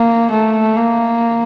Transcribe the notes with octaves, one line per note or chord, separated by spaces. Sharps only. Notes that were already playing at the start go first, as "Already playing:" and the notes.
Already playing: A#3
A3
A#3